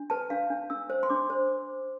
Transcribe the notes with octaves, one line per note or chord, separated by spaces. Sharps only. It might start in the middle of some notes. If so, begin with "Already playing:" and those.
Already playing: D4
B4 A5
D4 F5
D4
D4 E6
C5
C6
D4 D6
C5